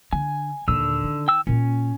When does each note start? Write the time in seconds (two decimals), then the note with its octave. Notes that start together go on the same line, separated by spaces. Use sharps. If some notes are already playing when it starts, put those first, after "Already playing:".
0.13 D3 G#5
0.68 D#2 A#2 D3 E6
1.04 D#3
1.28 G5 E6
1.47 A#2 A#3 C#4